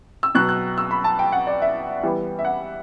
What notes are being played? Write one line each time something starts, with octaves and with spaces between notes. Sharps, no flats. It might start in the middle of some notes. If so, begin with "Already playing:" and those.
E6
B2 F#3 B3 F#6
F#6
E6
B5
A5
G5
F#5
D5
E5
E3 G3 B3
E5
F#5